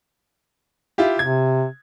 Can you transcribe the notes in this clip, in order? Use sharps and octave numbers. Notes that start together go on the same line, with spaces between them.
E4 F4 G4
C3 G#6